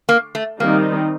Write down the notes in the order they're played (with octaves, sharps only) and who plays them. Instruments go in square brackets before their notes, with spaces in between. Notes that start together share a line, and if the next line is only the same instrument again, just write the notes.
[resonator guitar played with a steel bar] A#3
A3
[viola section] D#3 G3 C4 D#4 [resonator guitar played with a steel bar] A#3